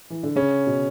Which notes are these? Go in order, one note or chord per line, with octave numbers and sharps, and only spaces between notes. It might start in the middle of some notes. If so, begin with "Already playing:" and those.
E3
D3
C#3 C#4
B2